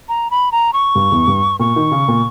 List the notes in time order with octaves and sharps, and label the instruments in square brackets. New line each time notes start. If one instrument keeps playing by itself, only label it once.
[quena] A#5
B5
A#5
C#6
[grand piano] G2
E2
G2
[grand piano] A#2 [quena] C#6
[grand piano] D#3
C#3
A#2